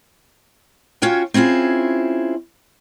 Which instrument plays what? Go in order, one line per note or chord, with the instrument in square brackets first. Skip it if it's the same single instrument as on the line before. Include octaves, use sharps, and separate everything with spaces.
[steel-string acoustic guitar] C#4 F4 F#4 C#5 G5
C4 C#4 E4 F4 G#4